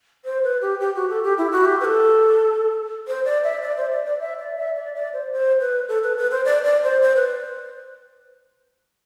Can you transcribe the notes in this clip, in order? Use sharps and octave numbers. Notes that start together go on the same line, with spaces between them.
C5
B4
G4
G4
F#4
A4
G4
E4
F#4
G4
B4
A4
C5
D5
E5
D5
C5
D5
D5
E5
D5
E5
D5
D5
C5
C5
B4
A4
B4
B4
C5
D5
D5
C5
C5
B4